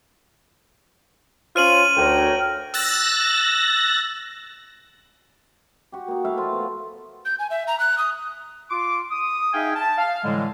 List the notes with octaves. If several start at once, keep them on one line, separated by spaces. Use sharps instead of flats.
C#4 F4 C5 F6 D#7 F#7
D2 A#4 C#5 G5
E6 F#6 A6 A#6
F#4 G4
A#3 D#4
A3 E4 E5 F5
F3 F4
B3
G6
G#5
E5
A#5
F#6
D#6
F4 C6 D6
D#6
D#4 G#4 E5 F5 G5 G#5
A5
F5
A2 D3 E3 G3 G#3